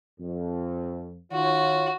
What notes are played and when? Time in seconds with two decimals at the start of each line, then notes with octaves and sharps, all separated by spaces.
0.20 F2
1.32 D#3 F4 F#4 C#5